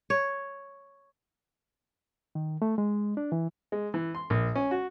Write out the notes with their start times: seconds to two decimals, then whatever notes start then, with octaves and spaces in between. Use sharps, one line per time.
0.10 C#5
2.35 D#3
2.62 A3
2.78 G#3
3.17 D4
3.32 E3
3.72 G#3
3.94 E3
4.15 C6
4.30 A#1
4.55 C#4
4.71 F#4